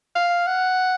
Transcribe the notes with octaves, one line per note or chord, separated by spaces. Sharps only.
F5
F#5